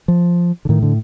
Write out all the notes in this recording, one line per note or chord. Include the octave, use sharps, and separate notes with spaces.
F3
D3
A2 D#3
D3